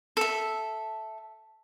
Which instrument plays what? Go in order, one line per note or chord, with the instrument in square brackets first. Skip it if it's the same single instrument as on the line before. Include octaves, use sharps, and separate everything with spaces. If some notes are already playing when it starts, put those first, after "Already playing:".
[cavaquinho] A4 E5